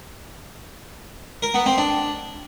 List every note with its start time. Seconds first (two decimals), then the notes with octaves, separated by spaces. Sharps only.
1.42 A#4
1.54 B3
1.66 C4
1.78 D4